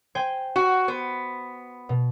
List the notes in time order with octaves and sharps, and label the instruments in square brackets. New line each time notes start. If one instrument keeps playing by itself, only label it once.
[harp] C5 G5 G#5
[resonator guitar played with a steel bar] F#4
[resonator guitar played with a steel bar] B3 [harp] C5
[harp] B2